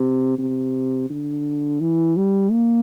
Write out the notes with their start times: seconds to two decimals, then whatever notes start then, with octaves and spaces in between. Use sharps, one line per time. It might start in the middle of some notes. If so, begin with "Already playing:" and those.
Already playing: C3
0.38 C3
1.10 D3
1.81 E3
2.16 G3
2.52 A#3